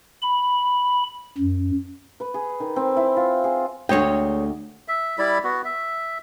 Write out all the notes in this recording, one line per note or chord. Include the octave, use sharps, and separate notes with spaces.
B5
F#2
B4
G#4
D#3
C4
E4
F4
G#4
D2 G#3 A3 C#5 G5
E5
G3 E4 D5 B5
B3 F#4
E5